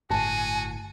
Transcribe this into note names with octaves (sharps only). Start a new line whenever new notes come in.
G1 A2 F#4 G#5 A5